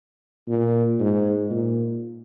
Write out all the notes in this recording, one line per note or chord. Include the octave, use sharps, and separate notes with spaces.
A#2
G#2
A#2